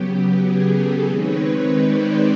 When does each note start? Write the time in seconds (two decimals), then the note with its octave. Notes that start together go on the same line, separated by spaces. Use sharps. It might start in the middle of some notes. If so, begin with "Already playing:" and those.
Already playing: C#3 F#3 B3 G4
0.35 G#4
0.70 G4 A4
1.05 D#3 G#3 C4 D#4 B4 C#5
1.76 C5 D5